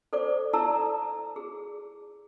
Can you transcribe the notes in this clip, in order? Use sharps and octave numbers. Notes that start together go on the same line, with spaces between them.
A4 C5 D5 D6
E4 A4 D5 A5 A#5 E6
G#4